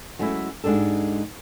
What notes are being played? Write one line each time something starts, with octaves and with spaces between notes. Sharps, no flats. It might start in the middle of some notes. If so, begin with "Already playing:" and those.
F#3 G#3 A3 C#4 E4
G#2 G#3 D4 G4 A4